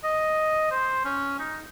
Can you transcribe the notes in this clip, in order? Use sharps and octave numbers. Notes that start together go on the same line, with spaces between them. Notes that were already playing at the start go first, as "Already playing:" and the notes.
D#5
C5
C#4
D#4